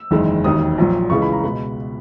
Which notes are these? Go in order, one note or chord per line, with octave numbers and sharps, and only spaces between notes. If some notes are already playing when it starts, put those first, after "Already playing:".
Already playing: E6
F#1 E2 D#3 G#3
E1 D#2 D#3 D#6
A#1 A#2 F#3
C#2 C#3 E3 G#3 C#6
B5
A#5
B2 G#3 B5